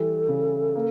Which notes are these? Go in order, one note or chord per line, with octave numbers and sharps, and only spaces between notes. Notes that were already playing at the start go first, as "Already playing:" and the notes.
Already playing: E3 G3 A4
C#3
A#3